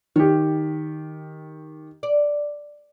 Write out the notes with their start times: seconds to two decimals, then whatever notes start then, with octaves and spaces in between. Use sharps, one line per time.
0.16 D#3 G4 C#5
2.03 D5